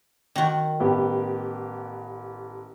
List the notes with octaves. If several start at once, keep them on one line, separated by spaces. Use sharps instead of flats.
D#3 F#4
A1 B3 G4